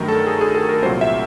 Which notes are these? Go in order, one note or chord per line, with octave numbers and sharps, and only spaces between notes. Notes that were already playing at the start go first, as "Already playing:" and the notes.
Already playing: G2 D#3 F#3 A3 A#4
A4
G#4
G#4
A4
A#4
C2 A#2 F#3 A#3 C5
E5